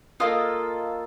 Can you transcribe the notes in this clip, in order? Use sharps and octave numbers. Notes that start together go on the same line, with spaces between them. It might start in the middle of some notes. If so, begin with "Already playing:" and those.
A#3 F4 A4 D#5